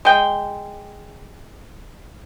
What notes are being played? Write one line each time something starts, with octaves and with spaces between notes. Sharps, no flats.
G#3 G5